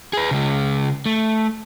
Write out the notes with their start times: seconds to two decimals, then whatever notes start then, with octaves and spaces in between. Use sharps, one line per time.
0.13 G#4 B4
0.31 C#3 G#3
1.06 A3